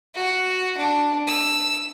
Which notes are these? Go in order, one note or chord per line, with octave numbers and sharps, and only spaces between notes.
F#4
D4
E6